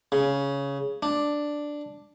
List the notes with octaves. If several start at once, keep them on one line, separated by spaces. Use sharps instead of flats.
C#3
D4